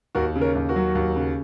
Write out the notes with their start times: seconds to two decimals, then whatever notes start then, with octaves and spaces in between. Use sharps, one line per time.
0.15 D#2 F#4 A#4
0.36 C#3
0.41 A#4 C#5
0.55 D#2
0.69 F#4 A#4
0.76 F#3
0.95 D#2
1.16 C#3